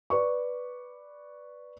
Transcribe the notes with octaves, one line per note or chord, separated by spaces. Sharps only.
B4 D5 C#6